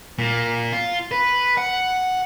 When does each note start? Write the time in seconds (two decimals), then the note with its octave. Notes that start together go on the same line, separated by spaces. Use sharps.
0.19 A#2
0.73 F4
1.11 B4
1.57 F#5